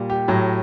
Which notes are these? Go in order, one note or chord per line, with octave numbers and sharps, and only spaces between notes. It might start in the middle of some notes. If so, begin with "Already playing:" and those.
Already playing: A#2 G3
G4
A2 F#3